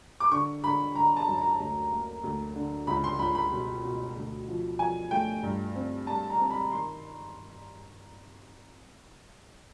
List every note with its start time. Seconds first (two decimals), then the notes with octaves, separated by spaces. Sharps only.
0.20 D6
0.31 D3 C#6
0.63 D3 B5
0.95 D3 A#5
1.17 A5
1.28 F#2
1.38 A#5
1.60 D2
1.92 A#3
2.24 D2
2.56 D3
2.87 C#2 B5
3.04 C6
3.19 C#2 B5
3.35 B5
3.52 B2
3.84 B2
4.16 D2
4.48 F3
4.79 F3 G#5
5.11 A3 G5
5.43 G2
5.75 C4
6.07 G3 A5
6.30 A#5
6.39 C4
6.50 B5
6.72 D#3 C6